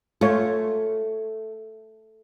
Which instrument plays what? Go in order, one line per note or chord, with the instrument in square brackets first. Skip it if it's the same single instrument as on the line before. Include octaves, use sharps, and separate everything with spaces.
[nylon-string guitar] A3 [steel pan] F4 C#5